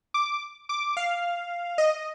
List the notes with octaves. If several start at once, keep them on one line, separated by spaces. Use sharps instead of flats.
D6
D6
F5
D#5